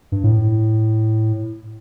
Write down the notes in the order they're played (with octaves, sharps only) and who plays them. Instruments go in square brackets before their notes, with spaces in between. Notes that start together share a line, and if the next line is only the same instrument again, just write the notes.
[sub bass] G2
A2